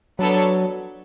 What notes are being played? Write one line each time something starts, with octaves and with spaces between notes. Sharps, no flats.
F#3 B3 D4 A4 C#5